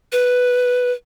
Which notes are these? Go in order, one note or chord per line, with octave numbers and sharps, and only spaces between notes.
B4